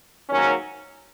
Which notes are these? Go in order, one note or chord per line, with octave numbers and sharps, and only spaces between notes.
G#2 D#3 F#3 A#3 C#4